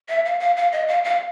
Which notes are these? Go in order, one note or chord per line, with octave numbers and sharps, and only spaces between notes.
E5
F5
F5
F5
D#5
F5
F5